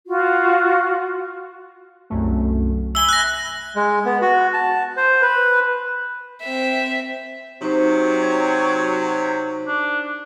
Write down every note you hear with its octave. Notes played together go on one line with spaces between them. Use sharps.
F4 F#4
C2 F#2 A3
E5 G#5 B5 E6 G7
F#6 A#6
G#3
B3
F#4
A5
C5
B4
C4 E5
C3 F#3 D#4 C5
C#5
D4